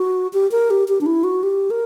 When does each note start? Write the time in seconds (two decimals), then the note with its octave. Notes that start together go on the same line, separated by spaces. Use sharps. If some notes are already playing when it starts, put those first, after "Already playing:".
Already playing: F#4
0.33 G4
0.52 A#4
0.70 G4
0.88 G4
1.01 D4
1.06 E4
1.24 F#4
1.43 G4
1.70 A#4